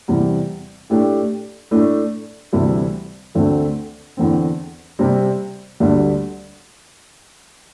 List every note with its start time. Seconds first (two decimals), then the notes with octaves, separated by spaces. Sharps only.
0.08 E2 C3 G3
0.90 A2 A3 D4 G4
1.71 A2 A3 D4
2.53 D2 C3 E3 G3 E4
3.35 D2 D3 A3 C4
4.17 E2 D3 C4
4.99 C3 G3 C4
5.80 D2 D3 G3